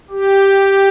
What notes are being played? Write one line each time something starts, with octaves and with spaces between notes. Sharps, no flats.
G4